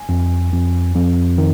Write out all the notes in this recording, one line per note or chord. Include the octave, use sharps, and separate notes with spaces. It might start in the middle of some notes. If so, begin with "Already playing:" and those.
Already playing: G#5
F2
F2
F2
D#3